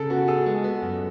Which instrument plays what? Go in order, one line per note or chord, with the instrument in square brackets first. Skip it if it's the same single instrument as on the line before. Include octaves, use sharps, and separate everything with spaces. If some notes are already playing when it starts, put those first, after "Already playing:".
Already playing: [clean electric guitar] C#3 [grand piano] A4
[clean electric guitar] B3 [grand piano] F#4
[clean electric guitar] G#4 [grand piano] A4
[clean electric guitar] G#3
B3
F#2